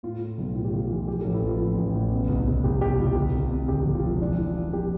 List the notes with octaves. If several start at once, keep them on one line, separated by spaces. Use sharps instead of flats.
A2 F4
A2
B1
A2 F4
G4
B1 F4
E3
F3 G4
A1 A4
E4
F3 F4
A2
A1
A1
B2
C2
C2
C2 G4
B2 G4
C2 F4
D2
C3
C3
D2 G4
E1
F4
F3
E3 D4
E3 E4
E3 F4
F2 G4